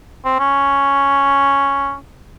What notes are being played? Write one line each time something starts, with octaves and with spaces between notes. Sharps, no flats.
C4
C#4